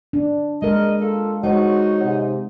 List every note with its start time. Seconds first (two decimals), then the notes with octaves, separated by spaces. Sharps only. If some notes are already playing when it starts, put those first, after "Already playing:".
0.13 D4
0.62 G#3 A#4 D#5
1.01 F4 A4
1.44 G#3 D#4 F#4 C5 C#5
2.03 G#2 C3